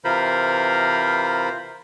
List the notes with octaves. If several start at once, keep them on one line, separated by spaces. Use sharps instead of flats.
C3 E3 F4 A#4 C5 B5